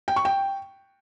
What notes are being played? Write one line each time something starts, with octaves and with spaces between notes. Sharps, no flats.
G5
C#6
G5